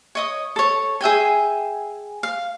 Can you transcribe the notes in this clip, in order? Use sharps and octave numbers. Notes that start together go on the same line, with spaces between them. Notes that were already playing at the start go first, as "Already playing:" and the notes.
C#5 D#5 D#6
A4 C#5
G#4 E5 G5 G#5
F5